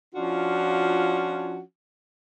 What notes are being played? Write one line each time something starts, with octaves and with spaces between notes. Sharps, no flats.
F3 C#4 D4 F4 F#4